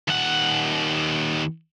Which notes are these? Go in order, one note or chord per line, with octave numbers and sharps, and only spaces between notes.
D#2 F#5